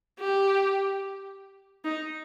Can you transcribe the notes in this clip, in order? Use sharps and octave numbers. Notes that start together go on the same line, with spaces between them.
G4
D#4